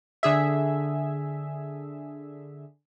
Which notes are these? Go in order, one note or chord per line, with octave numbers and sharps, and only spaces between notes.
D3 G#4 E5